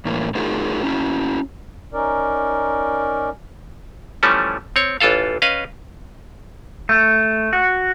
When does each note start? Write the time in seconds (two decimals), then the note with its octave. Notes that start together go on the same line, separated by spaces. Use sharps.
0.05 A2 E3 A#3
0.35 A3 D#4 F4 F#4 G#4 A#4
0.84 C#4 E4 F#4
1.94 C#4 D#4 A#4 D5
4.23 E3 F3 G3 A3 C#4
4.76 C4 C#5
5.00 A1 E3 F4 A4 F5
5.42 C#4 B4 D#5 F5
6.89 A3
7.53 F#4